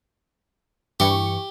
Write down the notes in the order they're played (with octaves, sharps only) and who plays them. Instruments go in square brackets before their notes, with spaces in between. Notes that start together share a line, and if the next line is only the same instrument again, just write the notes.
[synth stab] G2 E3 C#6 [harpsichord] G4